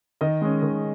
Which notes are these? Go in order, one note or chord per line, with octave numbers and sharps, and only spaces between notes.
D#3 D#5
G#3 C#4
D#3